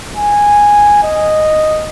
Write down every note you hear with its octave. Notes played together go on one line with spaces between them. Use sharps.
G#5
D#5